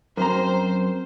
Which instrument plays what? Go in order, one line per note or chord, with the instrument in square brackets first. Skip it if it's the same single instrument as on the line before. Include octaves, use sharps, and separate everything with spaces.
[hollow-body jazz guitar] F#2 A#5 [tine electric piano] C4 A#4 [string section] C5